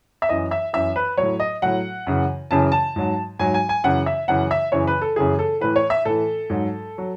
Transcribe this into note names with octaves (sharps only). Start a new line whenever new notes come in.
E5
F#2 E3 D#5
E5
F#2 E3 E5
B4
A2 F#3 C#5
D#5
A2 F#3 F#5
F#2 C#3 E3
F#2 C#3 E3 A5
A5
G#2 F#3
G#2 F#3 G#5
G#5
G#5
F#2 C#3 E3 F#5
E5
F#2 C#3 E3 F#5
E5
F#2 C#3 E3 C#5
B4
A4
F#2 C#3 E3 G#4
A4
A2 E3 B4
C#5
E5
A2 E3 A4
G#2 F#3
F#3